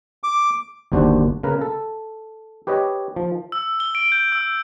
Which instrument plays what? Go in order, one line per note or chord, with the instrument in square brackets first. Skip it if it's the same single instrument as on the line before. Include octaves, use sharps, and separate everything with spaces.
[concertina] D6
[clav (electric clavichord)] G1 D#2 D4 F#4 C5
C#3 A#4 B4
A4
G4 B4 C#5 D#5
F3
[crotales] E6
G7
D7
G6
E6